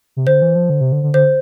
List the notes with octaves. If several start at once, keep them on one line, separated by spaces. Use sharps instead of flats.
C3
D3 C5
E3
F3
D3
C3
D3
D3
D3 C5